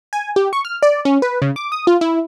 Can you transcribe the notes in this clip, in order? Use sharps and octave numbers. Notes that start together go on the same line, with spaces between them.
G#5
G4
C#6
F6
D5
C#4
B4
C#3
D6
D#6
F4
E4